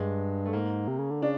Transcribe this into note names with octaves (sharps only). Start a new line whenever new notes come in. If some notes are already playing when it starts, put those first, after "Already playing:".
Already playing: G2 G#3
A3
G#2 A#3
C3
C#3
D3
C#3 D4